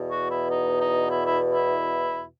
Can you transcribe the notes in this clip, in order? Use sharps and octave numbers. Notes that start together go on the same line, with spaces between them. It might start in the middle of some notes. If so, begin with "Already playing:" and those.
Already playing: E2 B2
F#4
E4
D#4
D#4
E4
E4
E4